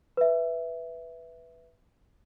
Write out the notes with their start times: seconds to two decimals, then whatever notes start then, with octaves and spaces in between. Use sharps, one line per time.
0.17 B4 E5